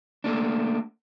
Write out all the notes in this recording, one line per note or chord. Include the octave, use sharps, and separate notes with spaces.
A3 A#3 D4